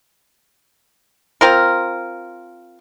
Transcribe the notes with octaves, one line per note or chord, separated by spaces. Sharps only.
C4 F4 A#4